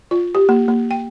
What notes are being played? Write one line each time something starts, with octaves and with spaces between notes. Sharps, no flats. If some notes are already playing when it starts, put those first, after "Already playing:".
F4
G4
A#3
A#3
G5